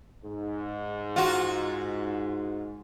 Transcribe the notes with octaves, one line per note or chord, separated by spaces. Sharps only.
G#2
F4 F#4